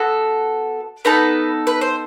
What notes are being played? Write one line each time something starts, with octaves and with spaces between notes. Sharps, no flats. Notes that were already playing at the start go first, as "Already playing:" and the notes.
Already playing: B3 F#4 A4
B3 D#4 A4 B4
B4
C5